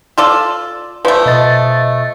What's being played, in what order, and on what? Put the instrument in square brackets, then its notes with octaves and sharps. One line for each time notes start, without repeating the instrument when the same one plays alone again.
[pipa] F4 A4 D5
[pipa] F3 A3 [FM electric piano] B4 D5
[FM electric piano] B2 D#5 A6